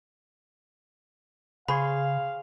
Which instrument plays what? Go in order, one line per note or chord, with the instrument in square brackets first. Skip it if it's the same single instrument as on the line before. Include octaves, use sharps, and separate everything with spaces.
[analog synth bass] C#3 [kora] G#4 C5 C#5 [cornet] F5 [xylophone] B5